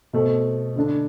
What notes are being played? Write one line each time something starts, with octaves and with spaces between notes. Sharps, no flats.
B2 A3 C4
D3 A3 D4